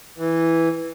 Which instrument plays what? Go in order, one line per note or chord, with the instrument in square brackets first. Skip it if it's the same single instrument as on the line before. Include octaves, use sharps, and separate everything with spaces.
[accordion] E3